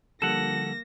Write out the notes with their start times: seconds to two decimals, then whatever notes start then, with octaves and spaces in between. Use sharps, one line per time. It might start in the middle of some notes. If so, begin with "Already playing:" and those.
0.22 D3 F3 G3 A#3 A4 F#5 A#6 E7